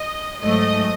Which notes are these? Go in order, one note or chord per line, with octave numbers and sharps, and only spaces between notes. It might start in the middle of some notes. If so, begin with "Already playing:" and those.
Already playing: D#5
G#2 F#3 A3 D#5